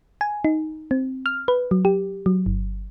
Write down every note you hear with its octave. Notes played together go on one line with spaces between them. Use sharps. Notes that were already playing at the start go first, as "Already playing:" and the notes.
G#5
D#4
C4
F6
B4
F#3
G4
F#3
G1